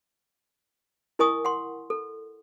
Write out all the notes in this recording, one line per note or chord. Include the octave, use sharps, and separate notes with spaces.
E4 A#4 D#5 G#5 C#6 D#6
F#5 G5 C6
A4